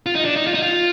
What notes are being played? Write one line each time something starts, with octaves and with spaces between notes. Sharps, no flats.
F4
D#4
D4
D#4
F4
D#4
F4